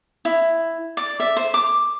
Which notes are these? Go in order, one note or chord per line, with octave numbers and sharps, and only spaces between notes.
E4
D5
E5
C5
D6